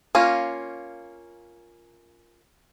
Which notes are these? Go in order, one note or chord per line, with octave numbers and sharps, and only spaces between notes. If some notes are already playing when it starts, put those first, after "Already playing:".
A#3 C#4 F4